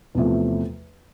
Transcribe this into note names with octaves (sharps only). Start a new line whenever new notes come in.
E2 C3 F3 A3